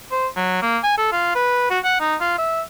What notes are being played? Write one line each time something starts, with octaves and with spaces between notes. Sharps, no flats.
C5
F#3
A#3
G#5
A4
F4
B4
F#4
F#5
D#4
F4
E5